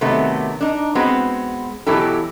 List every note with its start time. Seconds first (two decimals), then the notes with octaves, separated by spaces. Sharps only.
0.01 C3 D#3 F#3 A3 B3
0.61 D4 D#4
0.95 G#3 B3 C4 F#4
1.87 B2 E3 F#3 E4 G4 A4